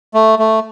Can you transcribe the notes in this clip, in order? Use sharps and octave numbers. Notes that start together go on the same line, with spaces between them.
A3
A3